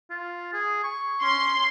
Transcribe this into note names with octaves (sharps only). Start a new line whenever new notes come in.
F4
G#4
C#6
C#4 C6